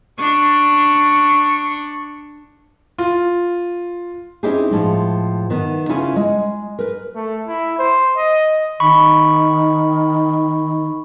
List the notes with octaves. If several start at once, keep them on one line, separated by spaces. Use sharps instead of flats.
D4 C#6
F4
C4 C#4 D#4 E4 G4 G#4
A2 F3 G#3
D#3 B3
C#3 C#4 E4 F4 G#5
G#3
A#4 B4
A3
E4
C5
D#5
D#3 B5 C#6